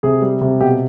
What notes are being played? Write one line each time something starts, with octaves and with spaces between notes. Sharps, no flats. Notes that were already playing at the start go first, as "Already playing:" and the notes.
C3 G#4
G3
C3
B2 G4